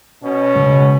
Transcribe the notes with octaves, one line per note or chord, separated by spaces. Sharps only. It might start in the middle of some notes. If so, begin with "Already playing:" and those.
B2 C#4
C#3 G#3